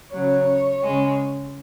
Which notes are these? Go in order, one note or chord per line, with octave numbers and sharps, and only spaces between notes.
C#3 F#3 C#5
C#3 G#3